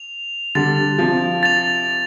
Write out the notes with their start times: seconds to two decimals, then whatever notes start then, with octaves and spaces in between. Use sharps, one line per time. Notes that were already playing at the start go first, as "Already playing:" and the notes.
Already playing: F7
0.55 D3 G3 A6 F7
0.98 C3 F3
1.43 A6 F7